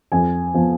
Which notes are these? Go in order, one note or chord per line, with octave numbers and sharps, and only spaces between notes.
F2 G#5
F3 B3